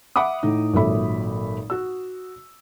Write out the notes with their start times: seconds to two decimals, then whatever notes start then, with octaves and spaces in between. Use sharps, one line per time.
0.16 E5 F#5 B5 D6 D#6
0.43 A2 D#4
0.74 G#1 A#2 F#3 A4 E5 B5
1.70 F#4 E6